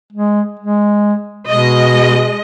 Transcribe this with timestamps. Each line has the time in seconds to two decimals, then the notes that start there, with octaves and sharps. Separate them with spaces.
0.12 G#3
0.60 G#3
1.48 B2 G#3 D#5